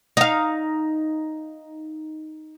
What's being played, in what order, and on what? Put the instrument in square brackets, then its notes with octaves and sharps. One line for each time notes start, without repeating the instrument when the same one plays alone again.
[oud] D#4 F5